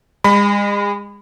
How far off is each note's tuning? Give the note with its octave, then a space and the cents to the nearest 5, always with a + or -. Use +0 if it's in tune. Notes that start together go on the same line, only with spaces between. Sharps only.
G#3 -35 B5 +20